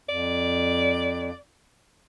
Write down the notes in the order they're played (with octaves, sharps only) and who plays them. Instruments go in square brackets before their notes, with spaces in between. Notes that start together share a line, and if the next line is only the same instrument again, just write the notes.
[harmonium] F2 [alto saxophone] D5